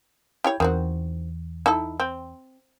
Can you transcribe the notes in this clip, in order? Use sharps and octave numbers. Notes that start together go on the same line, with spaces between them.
E4 G4 C#5
E2 D#3 C4 F#4
D#4 E4 A4
C4